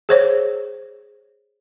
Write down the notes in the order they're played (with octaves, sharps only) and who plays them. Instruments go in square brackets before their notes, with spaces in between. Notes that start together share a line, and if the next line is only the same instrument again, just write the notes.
[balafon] G#4 C5 C#5